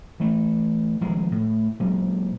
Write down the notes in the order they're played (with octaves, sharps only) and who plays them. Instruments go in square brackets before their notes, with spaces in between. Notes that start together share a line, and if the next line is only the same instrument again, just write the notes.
[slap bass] E3 A3
D#1 F3 G#3
A2
A#2 F#3 G#3